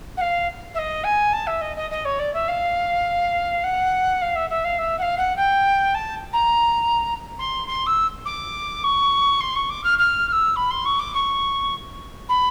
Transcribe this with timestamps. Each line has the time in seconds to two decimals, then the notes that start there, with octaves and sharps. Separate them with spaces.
0.17 F#5
0.21 F5
0.74 E5
0.78 D#5
1.03 G#5
1.32 A5
1.46 E5
1.61 D#5
1.76 D#5
1.90 D#5
2.05 C#5
2.19 D5
2.33 E5
2.48 F5
3.63 F#5
4.21 F5
4.35 E5
4.49 E5
4.64 F5
4.78 E5
4.98 F#5
5.02 F5
5.17 F#5
5.36 G5
5.94 A5
6.33 A#5
7.39 C6
7.67 C6
7.86 E6
8.25 D6
8.83 C#6
9.40 C6
9.55 C#6
9.69 D6
9.83 F6
9.98 F6
10.27 F6
10.32 E6
10.56 B5
10.70 C6
10.85 C#6
10.99 D6
11.14 C#6
12.28 B5